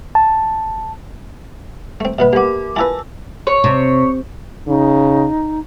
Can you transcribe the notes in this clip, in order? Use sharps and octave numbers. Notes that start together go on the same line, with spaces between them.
A5
A3 C4
B2 A#3 B3 B4 E5
A#3 B3 G4 A#4 D6
E4 F4 B4 G#5 A5 E6
C#5
C3
C#3 D#4